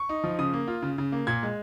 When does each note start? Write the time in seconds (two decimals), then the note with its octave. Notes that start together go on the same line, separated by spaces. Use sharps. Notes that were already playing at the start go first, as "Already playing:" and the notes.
Already playing: C#6
0.09 D#4
0.24 F3
0.39 C#3 D#6
0.53 A#3
0.68 F4
0.82 C#3
0.98 C#3
1.12 A#3
1.27 A#2 G#6
1.43 G#3